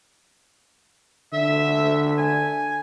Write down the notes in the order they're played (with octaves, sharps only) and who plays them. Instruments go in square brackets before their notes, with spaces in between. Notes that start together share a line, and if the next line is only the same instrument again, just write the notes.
[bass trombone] D3 [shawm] E5
[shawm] G#5